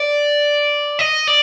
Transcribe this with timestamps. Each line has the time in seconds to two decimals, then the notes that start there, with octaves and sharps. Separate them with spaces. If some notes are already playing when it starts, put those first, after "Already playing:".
Already playing: D5
0.99 D#5
1.27 D5